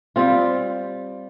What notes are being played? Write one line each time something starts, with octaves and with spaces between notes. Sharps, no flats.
G3 C4 F4